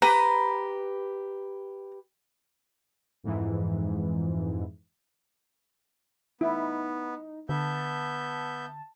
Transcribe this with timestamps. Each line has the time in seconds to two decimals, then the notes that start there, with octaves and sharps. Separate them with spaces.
0.02 G4 B4 A#5
3.24 F2 G#2 E3
6.41 B3 D#4 E4
7.49 D3 B3 E5 A5 G6